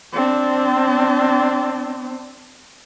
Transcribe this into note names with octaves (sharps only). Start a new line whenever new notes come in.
C4 D4